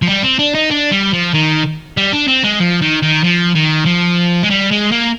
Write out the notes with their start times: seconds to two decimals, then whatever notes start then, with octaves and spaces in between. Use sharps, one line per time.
0.02 F3
0.07 G3
0.23 C4
0.39 D4
0.54 D#4
0.71 D4
0.91 G3
1.13 F3
1.33 D#3
1.97 G3
2.13 D4
2.28 C4
2.44 G#3
2.60 F3
2.82 D#3
3.02 D#3
3.23 F3
3.55 D#3
3.86 F3
4.43 G#3
4.50 G3
4.71 G#3
4.92 A#3